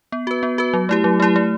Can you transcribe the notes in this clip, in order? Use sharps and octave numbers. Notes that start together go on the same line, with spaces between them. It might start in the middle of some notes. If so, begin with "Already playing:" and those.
B3
F#4 B4
B3
F#4 B4
F#3
A3 E4 G4
F#3
A3 E4 G4
A3